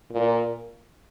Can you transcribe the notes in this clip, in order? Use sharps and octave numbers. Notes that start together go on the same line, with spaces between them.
A#2